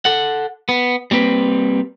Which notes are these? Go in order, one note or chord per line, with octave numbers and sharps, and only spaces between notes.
A4 F#5
B3
G3 A#3 C4 B4